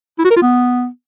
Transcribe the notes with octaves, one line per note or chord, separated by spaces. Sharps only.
E4
F#4
A#4
F4
B3